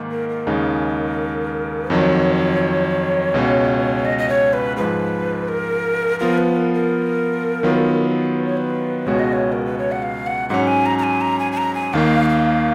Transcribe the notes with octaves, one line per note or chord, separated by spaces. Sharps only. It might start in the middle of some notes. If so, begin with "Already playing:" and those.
Already playing: G#2 D#3 A#3
A#4
A#4
D#2 C#3 G#3 D#4
F2 D#3 F#3 C#5
C#2 B2 G#3 C#4
D#5
D#5
C#5
B4
G#2 F3 G#3 B4
A#4
F3 B3 F4 A#4
B4
A#4
A#4
D#3 F#3 B3 F4
B4
C#5
B4
C#2 B2 G#3 B3 F#4 C#5
D#5
C#5
A#4
B4
C#5
F#5
F5
F#5
G#2 F#3 C#4 F#5
G#5
A#5
A#5
G#5
A#5
G#5
G#5
A#5
G#5
D#2 D#3 A#3 F5
F5